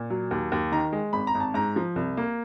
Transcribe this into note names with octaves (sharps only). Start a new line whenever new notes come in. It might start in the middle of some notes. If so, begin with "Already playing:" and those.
Already playing: A#2
F#3
D#2
D#2
D#3 A#5
G#3
G#1 B5
A#5
G#1
A5
G#2 A#5
F3
C2
A#3